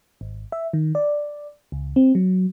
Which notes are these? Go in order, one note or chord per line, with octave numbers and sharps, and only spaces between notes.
G#1
E5
D#3
D5
C#2
C4
F#3